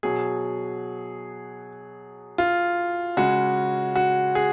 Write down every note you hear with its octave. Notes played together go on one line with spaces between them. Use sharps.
B2 F#3 G#4
F4
C#3 G#3 F#4
F#4
G#4